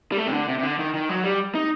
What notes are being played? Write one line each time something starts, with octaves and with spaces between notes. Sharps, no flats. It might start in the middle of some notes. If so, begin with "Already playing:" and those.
G3
A3
C3
D3
C3
C3
D3
D#3
D#3
F#3
G3
D#4